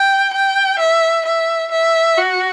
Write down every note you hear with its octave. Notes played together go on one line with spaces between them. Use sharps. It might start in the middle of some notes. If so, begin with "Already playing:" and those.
Already playing: G5
G5
E5
E5
E5
F#4